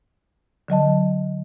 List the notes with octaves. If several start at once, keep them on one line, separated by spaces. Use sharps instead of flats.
D3 F#3 D#5 A5